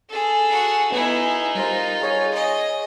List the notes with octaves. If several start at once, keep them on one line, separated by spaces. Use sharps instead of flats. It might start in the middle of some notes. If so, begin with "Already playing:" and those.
G#4 A4
F#4 F#5
B3 D#4 E4 G#4
G3 F4 A#4 C5
G#4 C#5 G#5
D#5